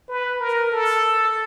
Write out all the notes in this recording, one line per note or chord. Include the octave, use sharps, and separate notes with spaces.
B4
A#4
A4